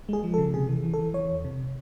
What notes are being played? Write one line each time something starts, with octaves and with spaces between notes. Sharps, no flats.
G#3 G#4
F3
C#3 A4
C3 G#4
E3
E3
A4
E3
E3 C#5
E2
C3